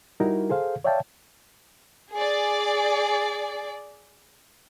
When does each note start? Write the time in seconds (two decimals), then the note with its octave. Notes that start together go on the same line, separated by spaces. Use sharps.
0.20 G3 D#4 E4 F#4 A#4
0.50 G#4 A4 C5 F5
0.84 C#5 D5 E5 F5 G5 A5
2.13 G#4 D5